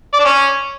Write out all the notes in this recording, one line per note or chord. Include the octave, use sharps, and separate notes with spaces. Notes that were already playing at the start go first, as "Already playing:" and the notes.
D5
D4
C#4